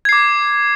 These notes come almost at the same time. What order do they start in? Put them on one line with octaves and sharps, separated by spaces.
G#6 C7 D6